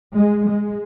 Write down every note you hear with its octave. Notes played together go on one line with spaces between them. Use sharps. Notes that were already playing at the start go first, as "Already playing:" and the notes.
G#3
G#3